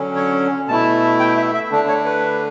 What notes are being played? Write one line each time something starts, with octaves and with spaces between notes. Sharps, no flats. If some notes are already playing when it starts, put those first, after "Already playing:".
Already playing: D3 F#3 C#4
C#5
B2 A3 E4 A5
G5
E5
E5
D3 A3 D4
C#5
B4